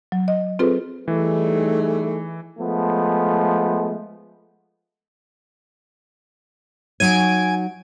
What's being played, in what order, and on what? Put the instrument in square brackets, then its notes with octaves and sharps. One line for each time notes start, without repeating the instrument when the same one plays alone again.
[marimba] F#3
D#5
C4 F4 G#4 A4 B4 C5
[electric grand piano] E3 [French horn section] G3 D#4 G#4 [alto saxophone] A3
[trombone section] F3 G#3 A3 B3
[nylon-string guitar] F#3 D#4 C#5 [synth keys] G#5 G#6 D7